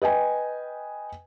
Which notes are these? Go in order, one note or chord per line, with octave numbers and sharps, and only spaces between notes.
B4 D#5 G5 G#5